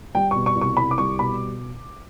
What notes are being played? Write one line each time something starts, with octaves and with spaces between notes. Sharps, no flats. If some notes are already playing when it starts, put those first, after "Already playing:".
G3 G5
B2 C#6
C#6
C2
C#6
C2 B5
D6
G3 C#6
B2 B5